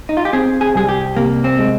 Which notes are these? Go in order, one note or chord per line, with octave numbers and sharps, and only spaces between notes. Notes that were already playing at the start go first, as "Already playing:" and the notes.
D#4
F4
G4
C4 G#4
G#4
C2 G#4
G4
C3 A#3
C4
G#3